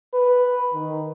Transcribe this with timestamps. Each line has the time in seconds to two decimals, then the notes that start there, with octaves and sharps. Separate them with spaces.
0.14 B4
0.74 D#3